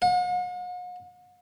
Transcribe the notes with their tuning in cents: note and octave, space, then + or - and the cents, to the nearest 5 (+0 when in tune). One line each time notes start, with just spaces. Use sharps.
F#5 -45